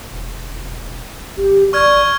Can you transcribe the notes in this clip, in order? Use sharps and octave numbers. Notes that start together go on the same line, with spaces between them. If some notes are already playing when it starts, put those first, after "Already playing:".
E1
G#1 G4
D5 C#6 F6 G#6